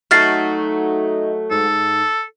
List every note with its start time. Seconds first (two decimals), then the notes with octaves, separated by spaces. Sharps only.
0.11 F#3 A3 D#4 F#4 F6 A6 C7
1.51 G#2 A4